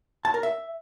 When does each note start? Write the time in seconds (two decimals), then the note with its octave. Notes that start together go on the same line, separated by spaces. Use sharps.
0.25 A5
0.34 A#4
0.43 E5